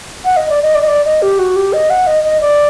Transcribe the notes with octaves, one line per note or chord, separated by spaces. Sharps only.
F#5
D#5
D5
D#5
D5
D#5
D5
D#5
G4
F#4
G4
D#5
F#5
D#5
D#5
D5